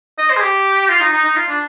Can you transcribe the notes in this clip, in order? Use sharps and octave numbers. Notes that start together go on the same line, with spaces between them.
D#5
C5
G#4
G4
F4
D#4
D#4
D#4
F4
D4